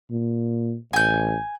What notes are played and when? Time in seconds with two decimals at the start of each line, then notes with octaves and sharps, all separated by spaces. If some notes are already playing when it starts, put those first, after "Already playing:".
0.11 A#2
0.93 A1 G#5 G6